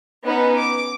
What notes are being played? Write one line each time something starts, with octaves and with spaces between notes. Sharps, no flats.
B3 C#4 D#4 B4
D6